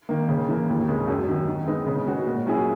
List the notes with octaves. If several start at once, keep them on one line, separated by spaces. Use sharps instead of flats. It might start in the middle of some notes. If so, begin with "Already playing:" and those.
D#3 A#3
C#3
E3 A#3
D#2
C#3 G#3
F#2
D#3 F#3
D#3
G#3 B3 D#4
C#3
G#3 C#4 F#4
A#2
F#3 C#4 E4 G#4